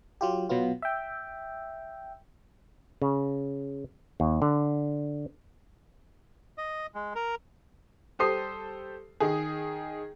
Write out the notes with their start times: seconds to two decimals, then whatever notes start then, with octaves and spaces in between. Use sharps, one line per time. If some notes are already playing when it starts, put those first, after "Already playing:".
0.21 F#3 F4 G4
0.49 B2 F#3 B3 F4
0.82 E5 G5
3.02 C#3
4.20 D#2
4.42 D3
6.58 D#5
6.95 G#3
7.15 A#4
8.19 G3 G4 A4 C5 D#6 C7
9.20 D#3 G#4